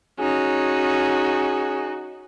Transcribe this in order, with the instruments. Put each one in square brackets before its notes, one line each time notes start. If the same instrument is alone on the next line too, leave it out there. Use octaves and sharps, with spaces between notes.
[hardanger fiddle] C#4 [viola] D#4 F#4 [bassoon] G#4